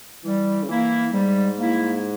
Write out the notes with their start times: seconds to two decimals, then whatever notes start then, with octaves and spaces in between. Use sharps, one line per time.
0.24 E3 G3
0.63 C#3
0.68 E3 A#3 E4
1.13 G#2 G3
1.57 A#3 E4